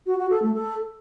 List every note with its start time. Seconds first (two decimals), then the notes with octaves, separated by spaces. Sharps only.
0.06 F#4
0.18 F#4
0.30 A4
0.42 A3
0.54 A4